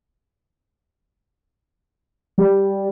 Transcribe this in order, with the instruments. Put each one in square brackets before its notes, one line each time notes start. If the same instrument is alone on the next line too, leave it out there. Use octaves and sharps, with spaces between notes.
[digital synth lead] G3